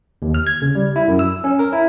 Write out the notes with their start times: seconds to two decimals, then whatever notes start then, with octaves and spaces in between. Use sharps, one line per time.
0.22 D#2
0.34 F6
0.47 G#6
0.62 C#3
0.75 G3
0.96 E4
1.08 F#2
1.19 E6
1.44 C#4
1.59 A#4
1.72 E4